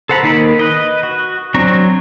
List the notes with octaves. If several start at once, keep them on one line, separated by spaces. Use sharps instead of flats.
A4 C5 F#5 A#5 B5
D#3 A#3 D#4 B5
B4 D#5
F#4
F#3 C4 D4 A#5 C#6